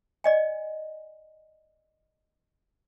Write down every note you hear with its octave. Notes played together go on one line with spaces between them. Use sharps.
D5 D#5 G#5